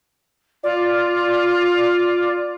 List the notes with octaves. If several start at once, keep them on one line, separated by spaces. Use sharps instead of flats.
F4 D5